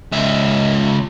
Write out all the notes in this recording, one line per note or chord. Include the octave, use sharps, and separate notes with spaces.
C#2 E5